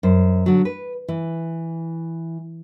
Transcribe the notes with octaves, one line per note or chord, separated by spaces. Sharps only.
F#2 C5
D3 F#3
B4
E3